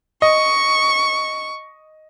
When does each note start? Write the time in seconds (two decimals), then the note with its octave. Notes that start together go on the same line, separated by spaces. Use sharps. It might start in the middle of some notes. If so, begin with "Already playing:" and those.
0.22 D#5 C#6